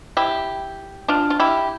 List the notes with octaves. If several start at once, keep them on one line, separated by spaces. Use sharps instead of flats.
E4 G4
D4 F4
F4
E4 G4